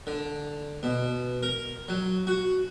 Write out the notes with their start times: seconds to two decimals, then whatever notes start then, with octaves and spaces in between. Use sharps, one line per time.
0.07 D3
0.83 B2
1.43 A#4
1.89 F#3
2.27 F#4